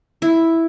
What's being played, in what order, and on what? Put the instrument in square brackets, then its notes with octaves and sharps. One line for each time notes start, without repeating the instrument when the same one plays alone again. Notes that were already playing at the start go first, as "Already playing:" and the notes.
[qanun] E4